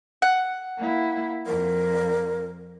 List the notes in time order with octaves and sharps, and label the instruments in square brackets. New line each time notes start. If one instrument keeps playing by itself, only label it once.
[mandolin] F#5
[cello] A#3 E4
[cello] F2 [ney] A#4